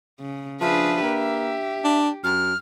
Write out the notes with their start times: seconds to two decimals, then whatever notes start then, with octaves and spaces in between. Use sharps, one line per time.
0.20 C#3
0.61 F3 D4 G#4 B4 E5
1.03 A#3 G4
1.84 D4
2.24 F#2 F6